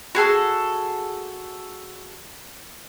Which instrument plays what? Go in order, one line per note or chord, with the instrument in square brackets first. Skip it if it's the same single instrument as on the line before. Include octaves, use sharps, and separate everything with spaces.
[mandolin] F#4 G#4 A4